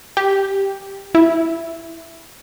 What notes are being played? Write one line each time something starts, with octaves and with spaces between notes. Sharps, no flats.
G4
E4